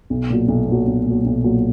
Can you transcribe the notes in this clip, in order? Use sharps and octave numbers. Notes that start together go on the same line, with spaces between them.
B1
A#2 F#3
B1
A#2 F#3
B1
A#2 F#3
B1
A#2 F#3